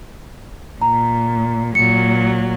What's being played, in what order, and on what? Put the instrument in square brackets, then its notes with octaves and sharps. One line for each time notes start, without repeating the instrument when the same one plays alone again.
[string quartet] A#2 [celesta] A#5
[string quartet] A#2 F#3 [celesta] C#7